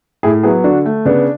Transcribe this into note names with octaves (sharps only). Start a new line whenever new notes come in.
A2 E4 G#4
F#3 B3 E4 G#4
D3 D4 F#4
A3
C#3 B3 D4